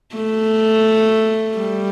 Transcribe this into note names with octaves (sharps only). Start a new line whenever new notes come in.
A3
G3